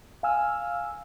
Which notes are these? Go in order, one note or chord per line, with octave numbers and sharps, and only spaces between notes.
F5 G#5 E6 F6